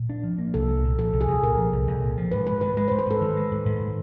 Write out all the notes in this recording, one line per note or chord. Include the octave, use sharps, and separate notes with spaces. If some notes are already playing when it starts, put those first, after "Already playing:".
Already playing: A#2
D4
F3
A#3
C2 A4
C2
A#2
F3 A4
C2
G#4
C2
A#2 A#4
F3
C2
C2
A#2
F3
G#2 B4
G#2 B4
D#3 B4
G#3 B4
C5
G#2
B4
G#2 A4
D#3
G#3
G#2
G#2
D#3